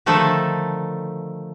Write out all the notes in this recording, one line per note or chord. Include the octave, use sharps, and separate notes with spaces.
D3 D#3 F3 A3 D#4 A4